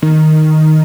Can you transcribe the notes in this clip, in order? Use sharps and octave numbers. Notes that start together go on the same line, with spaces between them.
D#3